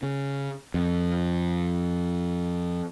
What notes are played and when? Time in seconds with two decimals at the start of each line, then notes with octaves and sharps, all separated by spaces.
0.03 C#3
0.74 F2